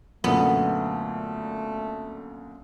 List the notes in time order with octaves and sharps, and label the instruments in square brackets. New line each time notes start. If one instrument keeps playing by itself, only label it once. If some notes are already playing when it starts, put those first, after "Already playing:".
[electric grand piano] F#2 A#2 D3 [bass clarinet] A3 [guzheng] B3